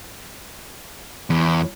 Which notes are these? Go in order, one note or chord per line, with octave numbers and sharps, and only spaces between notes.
E2